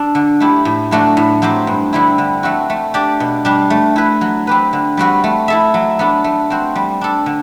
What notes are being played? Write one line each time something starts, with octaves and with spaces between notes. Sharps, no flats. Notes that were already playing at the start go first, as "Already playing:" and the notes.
Already playing: D4 A4
D3
A3 E4 G4
A2
F#3 A3 D4 F#4
A2
F#3 C4 G4 C5
G2
D3 G3 C4 E4
D3
A3 C4 F#4
A3
D4 G4 D5
B2
G3 D4
A3
E4 B4
F#3
C4 G4 B4
D3
G3 C4 F#4 B4
A3
E4 A4 E5
F#3
B3 D4 A4
A3
C4 F#4 C5
G3
D4 A4
D3